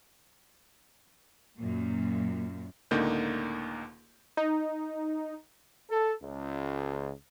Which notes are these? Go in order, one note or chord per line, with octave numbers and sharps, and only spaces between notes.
F#2 A#2
C#2 A2 D3 A#3 D#4 G6
D#4
A4
C#2